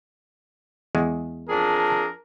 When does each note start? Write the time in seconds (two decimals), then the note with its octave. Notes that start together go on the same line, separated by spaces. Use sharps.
0.95 E2 G#3
1.49 F2 D4 G#4 A#4 A5